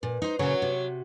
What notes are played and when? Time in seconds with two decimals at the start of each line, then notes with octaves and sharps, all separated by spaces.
0.03 A#2 B4
0.22 D#4 C5
0.39 A#2 C#3 F#3 C#5
0.62 C3